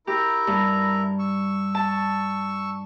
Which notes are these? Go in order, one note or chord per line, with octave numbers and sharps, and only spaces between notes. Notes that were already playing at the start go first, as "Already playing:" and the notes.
E4 G4 A#4 A#5
G2
C#6 E6
A5